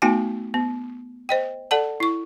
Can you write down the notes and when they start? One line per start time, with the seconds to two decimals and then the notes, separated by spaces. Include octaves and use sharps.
0.02 A3 B3 D#4 F#4 G5 G#5
0.54 B3
1.29 C5 D#5 G5
1.71 A4 D5 F#5 A5
2.00 E4 C#6